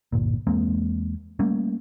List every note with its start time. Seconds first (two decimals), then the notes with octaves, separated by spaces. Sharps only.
0.12 D1 G1 A#2
0.47 E2 G#3 A#3 C4
1.39 G3 A3 A#3 C#4